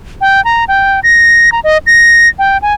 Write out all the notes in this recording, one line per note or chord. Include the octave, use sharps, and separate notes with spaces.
G5
A#5
G5
A#6
A#5
D#5
A#6
G5
G#5